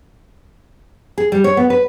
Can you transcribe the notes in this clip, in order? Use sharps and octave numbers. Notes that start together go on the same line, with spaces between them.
G#4
G3
C#5
B3
B4